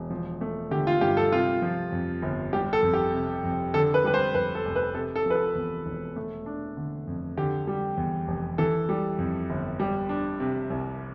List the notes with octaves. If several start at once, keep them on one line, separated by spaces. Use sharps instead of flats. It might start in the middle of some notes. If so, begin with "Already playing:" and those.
Already playing: E1
F3
A3
D3 G4
F4
G2 G4
A4
C3 F4
F3
F2
G1
G3 G4
A4
F2
G4
C3
F2
D3 A4
B4
G3 B4
C5
F2 B4
A4
F1
B4
C3 A4
A4
F3 B4
A4
E2
E1
A3
D4
D3
F2
D3 G4
G3
E2
F1
E3 A4
G3
F2
G1
G3
D4
C3
C2